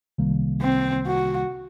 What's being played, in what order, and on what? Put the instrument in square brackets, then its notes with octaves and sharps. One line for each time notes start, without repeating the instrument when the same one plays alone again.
[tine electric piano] C2 C3 D#3 G3 A#3
[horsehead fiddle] C4
F#4